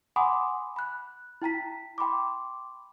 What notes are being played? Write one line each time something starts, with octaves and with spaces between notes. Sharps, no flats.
F#5 G#5 B5 C6 D6 D#6
B5 F#6
E4 G5 A#5 B6
G5 B5 C6 D6